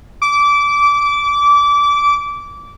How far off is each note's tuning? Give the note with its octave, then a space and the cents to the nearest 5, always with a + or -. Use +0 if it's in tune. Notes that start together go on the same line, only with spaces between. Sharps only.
D6 -20